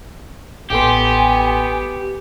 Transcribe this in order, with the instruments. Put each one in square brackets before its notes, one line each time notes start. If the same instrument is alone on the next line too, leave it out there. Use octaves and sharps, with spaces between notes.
[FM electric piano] A1 A4 C6 [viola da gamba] B3 [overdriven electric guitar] G4 [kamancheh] G#5